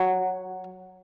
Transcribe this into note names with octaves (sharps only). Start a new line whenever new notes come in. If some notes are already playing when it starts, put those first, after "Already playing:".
Already playing: F#3